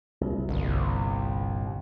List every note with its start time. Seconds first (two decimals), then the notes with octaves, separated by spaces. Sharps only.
0.21 C2
0.49 G1 C2 A#2